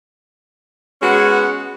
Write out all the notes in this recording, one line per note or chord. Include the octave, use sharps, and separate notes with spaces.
G#3 B3 C#4 F#4